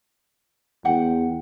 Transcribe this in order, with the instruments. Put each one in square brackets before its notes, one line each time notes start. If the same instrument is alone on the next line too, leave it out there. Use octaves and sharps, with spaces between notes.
[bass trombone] E2 [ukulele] F#5 G5